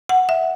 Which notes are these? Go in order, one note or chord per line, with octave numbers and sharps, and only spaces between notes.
F#5
E5